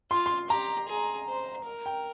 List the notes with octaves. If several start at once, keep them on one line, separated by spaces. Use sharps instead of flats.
F4 C6
C6
G4 A#5
G#4
C5
A#4
G5